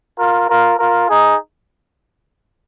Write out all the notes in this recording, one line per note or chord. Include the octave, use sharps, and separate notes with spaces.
F4 A#4
F4 A#4
F4 A#4
D#4 G#4